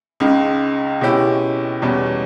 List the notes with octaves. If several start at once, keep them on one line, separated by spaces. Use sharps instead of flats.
C#2 C#3 G#3 D#4
B2 G#3 C#4 E4 G4
E2 B2 G3 C#4